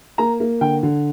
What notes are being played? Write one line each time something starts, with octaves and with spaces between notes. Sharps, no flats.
A#3 A#5
A#3
D3 G5
D3